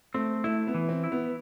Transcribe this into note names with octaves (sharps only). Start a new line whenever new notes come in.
A3 C4
A3 E4
B3
E3
C4
E4
B3